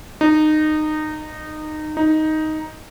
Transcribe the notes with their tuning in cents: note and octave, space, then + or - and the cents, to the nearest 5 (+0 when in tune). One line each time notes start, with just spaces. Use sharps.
D#4 -20
D#4 +5